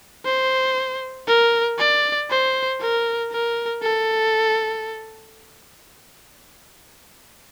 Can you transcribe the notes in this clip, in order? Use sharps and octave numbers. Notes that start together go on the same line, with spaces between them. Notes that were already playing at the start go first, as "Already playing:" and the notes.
C5
A#4
D5
C5
A#4
A#4
A4